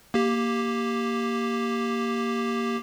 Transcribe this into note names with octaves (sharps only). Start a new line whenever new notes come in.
A#3 G4